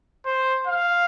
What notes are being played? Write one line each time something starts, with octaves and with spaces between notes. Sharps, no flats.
C5
F5